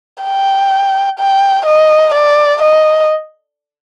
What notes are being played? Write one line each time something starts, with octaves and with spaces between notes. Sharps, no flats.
G5
G5
D#5
D5
D#5